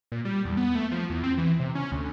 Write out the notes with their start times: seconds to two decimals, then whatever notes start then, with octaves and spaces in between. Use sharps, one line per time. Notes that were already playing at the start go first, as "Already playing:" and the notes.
0.12 A#2
0.25 G3
0.45 E2
0.57 B3
0.75 A3
0.92 F3
1.10 E2
1.24 C4
1.38 E3
1.59 C3
1.75 C#4
1.92 D2